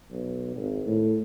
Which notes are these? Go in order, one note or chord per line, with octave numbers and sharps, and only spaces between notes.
B1
G#1
A2